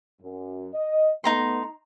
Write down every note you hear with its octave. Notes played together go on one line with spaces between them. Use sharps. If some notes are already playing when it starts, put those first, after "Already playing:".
F#2
D#5
A3 B3 D#4 A#5 C6